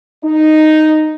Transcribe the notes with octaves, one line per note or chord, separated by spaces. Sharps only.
D#4